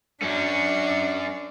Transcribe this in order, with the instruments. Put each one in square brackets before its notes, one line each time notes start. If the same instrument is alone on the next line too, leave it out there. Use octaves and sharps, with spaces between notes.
[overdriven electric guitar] F#2 C#4 [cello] D4